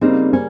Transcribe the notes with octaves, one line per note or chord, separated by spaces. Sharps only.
C#3 G3 A#3 C4 D#4
C#4